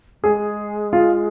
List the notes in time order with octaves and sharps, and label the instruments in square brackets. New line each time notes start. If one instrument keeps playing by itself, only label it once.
[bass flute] G#3 [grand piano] G#4
[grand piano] F4